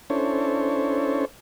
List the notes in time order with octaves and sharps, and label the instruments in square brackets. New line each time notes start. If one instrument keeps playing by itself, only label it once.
[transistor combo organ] C#4 D4 E4 A4 C5 C#5